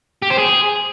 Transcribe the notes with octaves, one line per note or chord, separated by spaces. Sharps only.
G4
C5
G#4